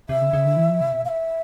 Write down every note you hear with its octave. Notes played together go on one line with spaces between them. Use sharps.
C3 E5
C#3
C#3
D3
E3
F3
C3
B2
F5
E5